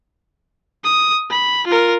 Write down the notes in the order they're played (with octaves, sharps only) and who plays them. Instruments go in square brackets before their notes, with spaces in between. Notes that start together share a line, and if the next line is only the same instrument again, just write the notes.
[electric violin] D#6
B5
F4 A#4